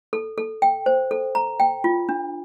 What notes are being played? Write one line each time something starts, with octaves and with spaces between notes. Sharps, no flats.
A4
A4
G5
C5
A4
A#5
G5
F4
D4